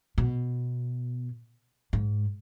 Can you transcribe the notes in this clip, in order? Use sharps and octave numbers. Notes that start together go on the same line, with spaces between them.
B2
G#2